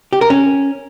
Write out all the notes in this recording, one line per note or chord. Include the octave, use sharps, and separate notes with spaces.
G4
A#4
C#4